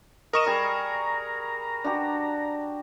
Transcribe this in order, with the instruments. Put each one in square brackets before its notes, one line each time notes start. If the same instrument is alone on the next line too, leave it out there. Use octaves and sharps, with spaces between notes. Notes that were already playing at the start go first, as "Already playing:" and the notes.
[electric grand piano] A#4 C#6 E7 [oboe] D#5
[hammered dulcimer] G3 G#4 [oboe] A#5
[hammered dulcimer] D4 F#4 G4